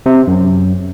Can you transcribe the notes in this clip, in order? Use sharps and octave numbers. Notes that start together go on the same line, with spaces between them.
C3
F#2